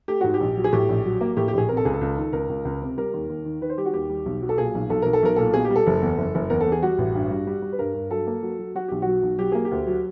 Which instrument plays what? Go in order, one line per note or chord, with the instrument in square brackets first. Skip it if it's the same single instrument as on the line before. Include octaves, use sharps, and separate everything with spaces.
[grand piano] A3 G4
G#2 F#4
G4
A#1
F#3
G#4
A2 G4
A#1
F#3
A#3
A2 G4
G4
A#1 G#4
C3 A#4
A4
C#2 G#4
A4
C#2
D#3
C#2 A#4
C#2
C#2
C3
G3 A#4
D#2
D#2
D#3
D#3 B4
C5
G3 G4
F#4
D#2 G4
G3
B1
F#3
A4
A#2 G#4
B1
B1 A4
B1 A#4
A4
B1 A#4
A#2 A4
B2 G#4
G4
G3
A4
F#1
E2
F#1
F#1
E2 A#4
A4
E2
G#4
G3 F#4
A1
G2
G3
G3
G3
B4
G2 A#4
G2
F#3 A4
A#3
F#3
F#3
F#3 F#4
B1 G4
F#3 F#4
B1
F#3 G4
A#3 G#4
G4
D2
F#3